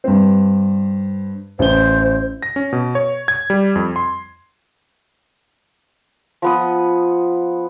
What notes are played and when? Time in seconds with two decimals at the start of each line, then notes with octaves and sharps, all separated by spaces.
0.04 G2 C4
1.59 A1 C5 G7
2.42 A#6
2.56 C#4
2.73 B2
2.95 C#5
3.28 G#6
3.50 G3
3.76 F2
3.96 C6
6.42 F3 B3 D#6